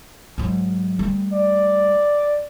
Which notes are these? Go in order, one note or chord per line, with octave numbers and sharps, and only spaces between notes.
G#2 F#3
G3 A3
D5